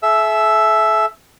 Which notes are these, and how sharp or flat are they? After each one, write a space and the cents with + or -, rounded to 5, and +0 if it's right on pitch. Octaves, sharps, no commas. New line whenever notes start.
A4 -45 E5 +0 E6 +0